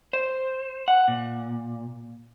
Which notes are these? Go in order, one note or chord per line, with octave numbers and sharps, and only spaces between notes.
C5
F#5
A#2